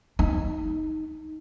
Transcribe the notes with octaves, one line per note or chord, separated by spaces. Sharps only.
D#4